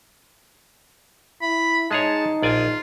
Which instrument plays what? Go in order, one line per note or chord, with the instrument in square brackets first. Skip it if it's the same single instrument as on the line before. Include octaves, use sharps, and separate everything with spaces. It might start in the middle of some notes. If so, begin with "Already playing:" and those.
[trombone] E4 [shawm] B5
[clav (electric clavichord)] G#3 G#4 C#5 [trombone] D#4 [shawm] A5
[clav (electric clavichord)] A#1 D5 G#5 [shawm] F4